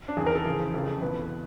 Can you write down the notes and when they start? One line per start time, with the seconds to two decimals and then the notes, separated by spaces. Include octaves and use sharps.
0.08 D4
0.17 E2 C3 D#3 G#4
0.26 A#4
0.35 A4
0.45 E2 C#3 F3 G#4
0.74 F1 F2 C#3 F3 A4
1.01 F1 E2 B2 B4